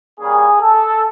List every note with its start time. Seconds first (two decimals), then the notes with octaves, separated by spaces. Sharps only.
0.20 G3 A#3 C#4 G#4
0.61 A4